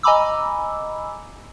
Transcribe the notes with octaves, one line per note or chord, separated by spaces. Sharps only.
D#5 G#5 A#5 B5 D6 E6